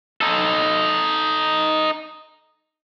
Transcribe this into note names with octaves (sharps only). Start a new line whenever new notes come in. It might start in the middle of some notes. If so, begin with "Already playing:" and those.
D#4 A4